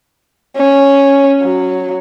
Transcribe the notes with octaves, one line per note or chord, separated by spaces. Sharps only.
C#4
F#3